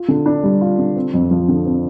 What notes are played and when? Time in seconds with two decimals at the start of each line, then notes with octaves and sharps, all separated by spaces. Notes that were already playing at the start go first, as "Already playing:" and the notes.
Already playing: F4
0.08 D3
0.26 D4
0.43 G3
0.61 F4
0.79 D3
0.96 C4
1.14 F2
1.31 F3
1.48 D3
1.66 C4